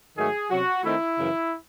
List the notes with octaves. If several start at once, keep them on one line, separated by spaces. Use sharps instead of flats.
G#2 D#3 F#3 A3 G#4
C3 F#3 C#4 F#4
D#3 A3 C4 D#4 E4
F#2 C#3 E3